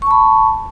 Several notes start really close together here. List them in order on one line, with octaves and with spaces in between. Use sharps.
C#6 A5 B5